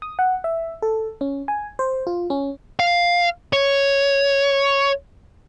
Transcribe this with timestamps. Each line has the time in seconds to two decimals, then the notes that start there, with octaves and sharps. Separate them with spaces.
0.02 D#6
0.19 F#5
0.44 E5
0.82 A4
1.21 C#4
1.48 G#5
1.79 C5
2.07 F4
2.30 C#4
2.80 F5
3.53 C#5